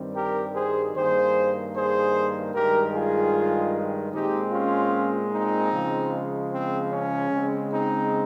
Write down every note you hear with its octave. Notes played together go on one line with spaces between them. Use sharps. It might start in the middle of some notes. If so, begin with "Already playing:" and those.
Already playing: G2 D#3 G3 C4
G4 A#4
G#4 C5
G2 D#3 A#3 G#4 C5
G#4 C5
G2 D#3 G#3 G4 A#4
F4 G#4
A#2 G#3 C4 D#4 G4
C#4 F4
C4 D#4
C#3 F3 G#3
C4
C#4
C#3 G#3 C4
C4 D#4